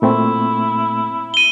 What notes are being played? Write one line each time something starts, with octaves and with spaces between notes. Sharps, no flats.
A#2 A3 C4 E4
D#7 G7